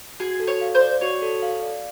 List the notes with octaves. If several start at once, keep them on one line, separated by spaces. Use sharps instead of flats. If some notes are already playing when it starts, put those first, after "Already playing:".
F#4 G#4
A4
C#5
F5
C5
D5
F#4 C#5
A4
F5
D5